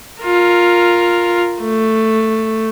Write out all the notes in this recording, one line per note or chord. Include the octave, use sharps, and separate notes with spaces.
F4 A#4
A3